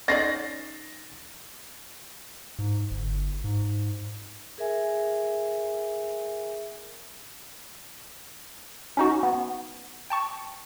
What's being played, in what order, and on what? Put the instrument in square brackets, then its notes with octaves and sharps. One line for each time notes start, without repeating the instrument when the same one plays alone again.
[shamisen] C#4 D#4 D5 [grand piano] A6 A#6 C7
[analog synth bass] G#2
G1
G#2
[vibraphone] G#4 A#4 E5 G#5
[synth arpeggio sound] C#4 D#4 F#4
B3
G5 A5 C#6